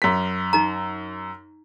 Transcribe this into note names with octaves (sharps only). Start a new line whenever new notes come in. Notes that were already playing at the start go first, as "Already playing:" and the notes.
F#2 B6
D#4 A#5